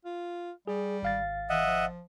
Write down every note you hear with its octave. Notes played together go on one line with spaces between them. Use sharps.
F4
G3 G#4
G#1 F5 A6
E3 D#5 E5 F#5
F3